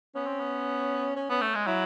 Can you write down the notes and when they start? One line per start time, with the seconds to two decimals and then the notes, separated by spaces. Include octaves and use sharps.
0.15 B3 C#4
0.27 C4
0.40 B3
1.16 C#4
1.30 B3 C#4
1.41 A3
1.55 G#3
1.67 F#3 E4